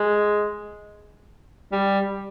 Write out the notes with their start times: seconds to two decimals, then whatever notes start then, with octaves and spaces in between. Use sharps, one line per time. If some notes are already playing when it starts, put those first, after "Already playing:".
Already playing: G#3
1.72 G3